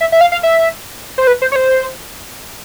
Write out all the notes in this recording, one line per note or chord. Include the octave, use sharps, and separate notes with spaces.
E5
E5
F5
F5
E5
C5
B4
C5
C#5
C5